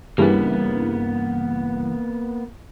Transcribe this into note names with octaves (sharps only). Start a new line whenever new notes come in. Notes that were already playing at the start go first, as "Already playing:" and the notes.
G2 C#3 E3 A#3 B3